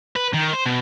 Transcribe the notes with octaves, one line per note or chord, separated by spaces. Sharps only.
B4
D#3
C5
B2